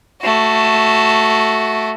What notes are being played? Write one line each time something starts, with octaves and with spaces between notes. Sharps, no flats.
A3 F#4